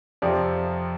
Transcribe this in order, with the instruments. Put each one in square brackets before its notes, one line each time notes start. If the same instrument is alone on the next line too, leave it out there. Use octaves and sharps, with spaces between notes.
[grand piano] F2 C3 F3 D5